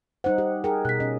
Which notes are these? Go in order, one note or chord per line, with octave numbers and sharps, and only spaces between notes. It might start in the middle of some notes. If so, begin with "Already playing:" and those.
G3 D#4 C5 F#5
G4
G#4 A#4 G5
B2 F#6 B6
C#4 D#5